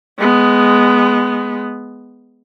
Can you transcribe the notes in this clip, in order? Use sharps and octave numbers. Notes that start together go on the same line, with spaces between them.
G#3 B3